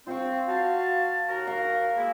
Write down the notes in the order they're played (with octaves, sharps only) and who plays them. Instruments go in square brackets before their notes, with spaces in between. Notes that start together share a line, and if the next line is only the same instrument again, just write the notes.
[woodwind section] C4 [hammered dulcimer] F4 C#6
[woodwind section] F#4 F5 A5
D#2 F#4 A#4
[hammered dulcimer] F5
[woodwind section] G#3 A#3 E4